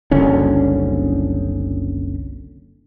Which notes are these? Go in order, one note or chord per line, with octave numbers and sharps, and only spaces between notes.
F#1 C2 D3 C#4